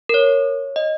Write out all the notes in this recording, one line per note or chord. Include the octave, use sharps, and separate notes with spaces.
A#4
C#5
D#5